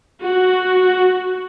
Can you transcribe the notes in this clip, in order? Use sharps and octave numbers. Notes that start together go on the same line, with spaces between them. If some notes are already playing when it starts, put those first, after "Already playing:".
F#4